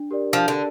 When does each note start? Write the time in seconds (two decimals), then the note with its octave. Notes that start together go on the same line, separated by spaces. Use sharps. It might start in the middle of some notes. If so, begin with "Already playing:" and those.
Already playing: D4
0.11 G4 A#4 D5
0.33 F3 D4
0.48 D3